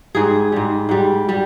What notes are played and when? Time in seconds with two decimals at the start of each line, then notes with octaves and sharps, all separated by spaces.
0.15 G#2 G3 G#4
0.52 G#2 G3
0.89 G#2 G3
1.29 G3